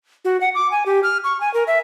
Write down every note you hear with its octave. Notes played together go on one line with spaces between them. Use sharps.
F#4
F#5
D6
G#5
G4
F6
C#6
G#5
A#4
E5